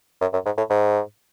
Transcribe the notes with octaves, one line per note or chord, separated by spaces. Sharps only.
F#2
F#2
G#2
A2
G#2